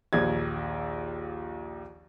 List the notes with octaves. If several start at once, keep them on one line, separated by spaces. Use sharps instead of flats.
A#1 D#2 G#6